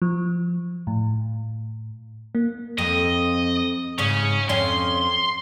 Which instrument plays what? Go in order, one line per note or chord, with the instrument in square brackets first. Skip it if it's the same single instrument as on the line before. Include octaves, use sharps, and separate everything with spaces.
[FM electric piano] F3
A2
A#3
[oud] F2 [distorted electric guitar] D#5
[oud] G#2 C#3 [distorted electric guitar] C#4
[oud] F2 C#4 [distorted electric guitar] C6